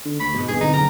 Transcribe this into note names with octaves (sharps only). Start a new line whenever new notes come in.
D3
D2 B5 C#6
E1 G#2 B2 B4
G1 G#4
C2 D3 D#4
F#1 G5 A#5 F6